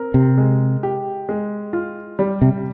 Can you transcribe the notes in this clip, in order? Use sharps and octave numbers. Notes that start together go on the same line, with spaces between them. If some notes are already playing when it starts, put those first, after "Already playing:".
Already playing: C4 A#4
C3
G#3
G4
G#3
F4
G3
C3